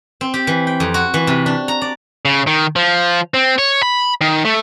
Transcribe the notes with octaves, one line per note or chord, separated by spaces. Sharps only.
C4
G4
E3
G5
F2
F#4
E3
C3
D4
A#5
D5
C#3
D#3
F3
C4
C#5
B5
D#3
A3